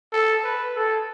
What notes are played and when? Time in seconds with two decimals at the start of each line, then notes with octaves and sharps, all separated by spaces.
0.13 A4
0.44 B4
0.75 A4